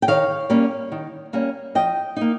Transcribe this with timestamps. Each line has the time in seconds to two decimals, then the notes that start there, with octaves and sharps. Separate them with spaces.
0.02 G5
0.08 D#3 C#5 F5
0.50 G3 A#3 C#4
0.92 D#3
1.33 G3 A#3 C#4
1.75 F3 D#5 G5
2.17 A#3 D#4